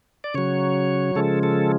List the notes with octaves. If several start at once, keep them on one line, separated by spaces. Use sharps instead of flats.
D5
C#3 F#3 C#5
C#3 F3 G#3 A4
A4